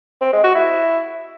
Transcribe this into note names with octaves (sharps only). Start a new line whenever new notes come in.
C4
G#3
F#4
E4